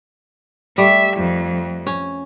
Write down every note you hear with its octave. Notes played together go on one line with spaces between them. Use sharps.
G3 A3 E5
F2
C#4